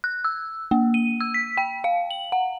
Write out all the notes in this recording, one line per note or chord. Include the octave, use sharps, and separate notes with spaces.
F#6
E6
A#3
D#7
E6
B6
G5
F5
F#7
F#5